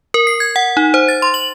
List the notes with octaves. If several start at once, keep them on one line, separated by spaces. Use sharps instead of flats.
A#4
C7
G#6
F#5
D#4
C5
A6
C6
F#7